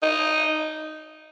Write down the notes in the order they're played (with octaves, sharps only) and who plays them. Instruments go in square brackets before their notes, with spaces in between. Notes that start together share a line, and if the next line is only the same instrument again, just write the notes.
[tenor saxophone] D#4